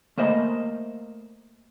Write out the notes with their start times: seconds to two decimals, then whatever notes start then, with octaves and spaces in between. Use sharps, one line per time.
0.18 A3 A#3 C5 D#5